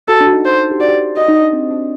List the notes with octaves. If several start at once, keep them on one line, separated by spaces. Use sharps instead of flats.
F#4 A4
D4
F#4
D#4
F#4 C5
G4
F#4 D5
G4
F#4 D#5
D#4
D4
C4
D4